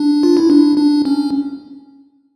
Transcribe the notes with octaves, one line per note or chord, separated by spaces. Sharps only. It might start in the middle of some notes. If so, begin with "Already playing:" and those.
Already playing: D4
F4
E4
D4
D4
C#4